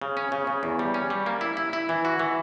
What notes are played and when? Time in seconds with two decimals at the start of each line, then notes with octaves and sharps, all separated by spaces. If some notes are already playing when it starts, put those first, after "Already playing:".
0.02 C#3
0.17 C#4
0.32 C#3
0.47 C#3
0.63 E2
0.79 G3
0.94 C#4
1.10 G3
1.26 A#3
1.41 E4
1.57 E4
1.73 E4
1.89 E3
2.05 F#4
2.19 E3